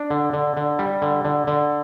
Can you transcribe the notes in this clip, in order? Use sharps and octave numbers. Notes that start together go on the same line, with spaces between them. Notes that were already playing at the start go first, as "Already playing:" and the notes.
Already playing: D4
D3
D3
D3
G3
D3
D3
D3